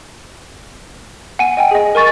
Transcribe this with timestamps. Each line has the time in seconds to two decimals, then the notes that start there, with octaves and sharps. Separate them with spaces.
1.39 F#5 G#5 D#7
1.57 D#5 G5 G#5
1.71 G#4 D#5
1.95 A#4 G#5 C#6 A6